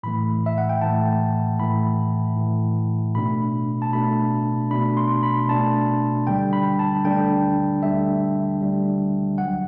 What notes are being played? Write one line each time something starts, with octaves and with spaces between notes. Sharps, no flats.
A2 E3 A3 B5
E5
F#5
G5
A2 E3 A3 A5
A2 E3 A3 B5
A2 E3 A3
B2 A3 D4 B5
A5
B2 A3 D4 B5
B2 A3 D4 B5
C6
B5
B2 A3 D4 A5
D2 D3 G3 D4 G5
B5
A5
D2 D3 G3 D4 G5
D2 D3 G3 D4 E5
D2 D3 G3 D4
C2 C3 F#3 F#5